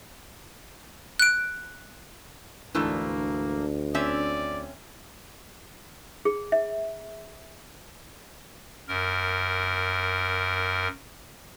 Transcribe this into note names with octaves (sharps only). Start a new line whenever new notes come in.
F#6 D7
D2 G#2 E3 A3 A#3 D4
C4 C#4 D5 E5
G#4
E5
F#2 A#4